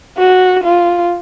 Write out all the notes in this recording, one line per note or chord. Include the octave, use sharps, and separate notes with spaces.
F#4
F4